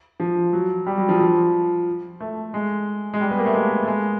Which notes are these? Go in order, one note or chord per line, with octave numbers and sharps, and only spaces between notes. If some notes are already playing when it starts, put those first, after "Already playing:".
F3
F#3
G3
F#3
F3
F3
A3
G#3
G#3
G3
B3
A#3
A3
G#3
A3
G#3